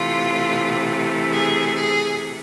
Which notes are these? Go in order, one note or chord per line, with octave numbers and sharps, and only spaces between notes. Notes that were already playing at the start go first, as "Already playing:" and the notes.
Already playing: C3 E3 A3 F4
G#4
G#4